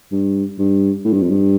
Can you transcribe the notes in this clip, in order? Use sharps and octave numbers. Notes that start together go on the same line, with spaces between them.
G2
G2
A2
G2
F2
G2